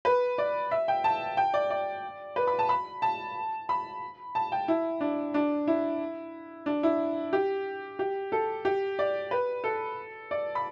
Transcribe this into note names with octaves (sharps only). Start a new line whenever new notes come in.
B4
D5
E5
G5
A5
G5
D5
D5
B4
B5
A5
B5
A5
B5
A5
G5
E4
D4
D4
E4
D4
E4
G4
G4
A4
G4
D5
B4
A4
D5
B5